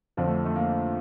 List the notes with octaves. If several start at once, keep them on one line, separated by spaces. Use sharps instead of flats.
F2 D3 F3 D4
A3
A3
A#3